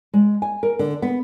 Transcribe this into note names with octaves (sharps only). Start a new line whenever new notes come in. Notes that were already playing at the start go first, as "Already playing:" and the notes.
G#3
G#5
A#4
D3
B3